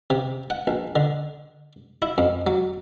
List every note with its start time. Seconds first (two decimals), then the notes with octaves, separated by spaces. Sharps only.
0.10 C3
0.50 F#5
0.67 A#1
0.96 D3
2.02 E4
2.18 F2
2.47 F#3